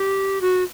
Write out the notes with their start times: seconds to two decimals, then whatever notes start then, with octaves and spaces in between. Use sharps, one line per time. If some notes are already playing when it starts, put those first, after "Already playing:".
Already playing: G4
0.41 F#4